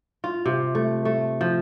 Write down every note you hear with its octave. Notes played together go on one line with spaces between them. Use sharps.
F4
C3
A3
A3
F3